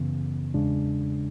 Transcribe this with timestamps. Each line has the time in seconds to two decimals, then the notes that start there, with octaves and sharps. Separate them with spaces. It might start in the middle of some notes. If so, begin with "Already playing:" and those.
Already playing: F#2 C#3 E3 B3
0.54 E2 C#3 G#3 D4